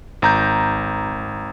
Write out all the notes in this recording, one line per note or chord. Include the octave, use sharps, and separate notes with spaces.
G#1 A#5 G6